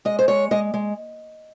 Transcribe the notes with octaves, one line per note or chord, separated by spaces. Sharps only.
G#3 D#5
C5
G#3 C#5
G#3 D#5
G#3